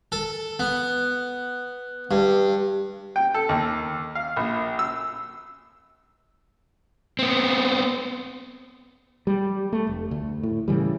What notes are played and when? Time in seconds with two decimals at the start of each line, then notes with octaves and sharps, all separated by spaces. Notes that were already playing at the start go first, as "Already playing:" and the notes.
0.12 A4
0.60 B3
2.11 G2
3.16 G5
3.34 A4
3.49 D#2
4.15 F5
4.36 A#1
4.79 E6
7.19 B3 C4
9.27 G3
9.72 A3
9.87 F1
10.11 D2
10.43 A2
10.68 A2 C#3 E3 G3